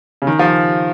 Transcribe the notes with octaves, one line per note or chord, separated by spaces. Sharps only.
C#3
D#3
F3